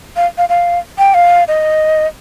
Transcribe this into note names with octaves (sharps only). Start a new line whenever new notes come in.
F5
F5
F5
G5
F5
D#5